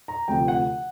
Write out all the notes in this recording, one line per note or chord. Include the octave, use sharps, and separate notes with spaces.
A#5
D2 C3 F3 G5
F#5